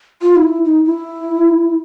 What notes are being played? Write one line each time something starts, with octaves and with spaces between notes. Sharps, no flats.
F4
D#4
E4
D#4
E4